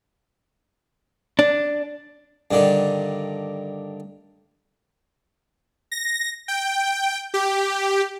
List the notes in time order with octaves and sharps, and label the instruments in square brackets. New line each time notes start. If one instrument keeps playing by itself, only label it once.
[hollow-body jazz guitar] D4
[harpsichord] G2 D3 D#3
[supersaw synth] A#6
G5
G4